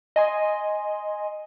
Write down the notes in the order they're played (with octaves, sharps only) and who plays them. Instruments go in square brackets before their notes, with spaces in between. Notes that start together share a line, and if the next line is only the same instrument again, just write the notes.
[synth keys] D#5 G#5 C6